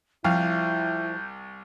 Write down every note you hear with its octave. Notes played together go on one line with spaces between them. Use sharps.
C2 F3 E4 F5 G6